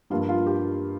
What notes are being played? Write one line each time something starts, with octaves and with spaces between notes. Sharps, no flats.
G2 F3 A#3 F4
F4
G4